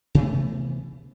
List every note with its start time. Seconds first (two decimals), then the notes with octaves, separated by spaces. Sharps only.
0.15 C3 E3 A3 B3